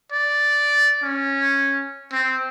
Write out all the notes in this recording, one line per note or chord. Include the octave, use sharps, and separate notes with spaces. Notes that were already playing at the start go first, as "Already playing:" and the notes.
D5
C#4
C4